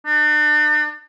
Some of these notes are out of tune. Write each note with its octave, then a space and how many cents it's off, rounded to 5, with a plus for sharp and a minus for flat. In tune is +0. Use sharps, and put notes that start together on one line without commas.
D4 +40